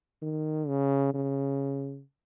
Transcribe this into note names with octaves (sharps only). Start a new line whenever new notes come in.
D#3
C#3
C#3